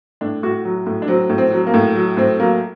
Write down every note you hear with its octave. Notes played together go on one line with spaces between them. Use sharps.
A2 D4
A2 F#4
F#3
A2
D4
F#3 C4
A2
C4
F#3
A#3
A2
F#3
A2 C4
F#3 A#3